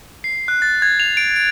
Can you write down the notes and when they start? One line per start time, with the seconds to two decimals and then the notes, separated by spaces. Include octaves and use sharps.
0.24 C7
0.48 F#6
0.62 A6
0.82 G#6
1.00 F7
1.17 D7
1.36 D7